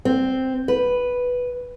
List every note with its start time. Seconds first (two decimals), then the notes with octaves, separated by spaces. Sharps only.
0.05 C4
0.68 B4